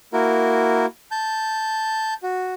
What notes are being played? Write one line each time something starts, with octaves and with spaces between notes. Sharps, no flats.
A#3 E4 F#4 A#4
A5 G6
F#4